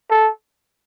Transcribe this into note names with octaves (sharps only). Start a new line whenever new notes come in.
A4